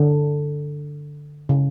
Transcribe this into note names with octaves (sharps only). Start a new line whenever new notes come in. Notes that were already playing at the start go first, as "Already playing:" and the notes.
Already playing: D3
C#3